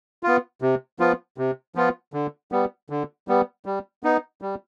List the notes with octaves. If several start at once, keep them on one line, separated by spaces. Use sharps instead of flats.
B3 F4
C3
F3 B3 F4
C3
F3 B3 F4
D3
G3 B3
D3
G3 B3
G3
B3 D#4
G3